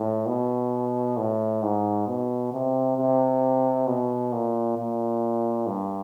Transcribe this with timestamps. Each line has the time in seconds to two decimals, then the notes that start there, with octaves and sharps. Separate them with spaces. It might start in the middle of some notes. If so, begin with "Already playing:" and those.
Already playing: A2
0.26 B2
1.17 A2
1.62 G#2
2.07 B2
2.52 C3
2.97 C3
3.87 B2
4.32 A#2
4.77 A#2
5.67 G2